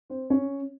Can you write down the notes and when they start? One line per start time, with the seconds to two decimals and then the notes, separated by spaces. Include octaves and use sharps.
0.10 C4 C5
0.30 C#4 C#5